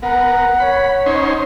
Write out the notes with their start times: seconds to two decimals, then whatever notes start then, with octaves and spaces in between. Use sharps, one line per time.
0.02 B3 A#4 F#5 A#5
0.60 C#5 B5
1.06 C#4 D#4 C5